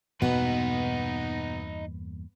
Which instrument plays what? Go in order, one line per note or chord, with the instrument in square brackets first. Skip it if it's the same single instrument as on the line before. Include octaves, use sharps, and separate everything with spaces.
[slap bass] E2 G2 A#3 [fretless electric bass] B2 [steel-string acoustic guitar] B3 [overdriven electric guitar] D#4 B4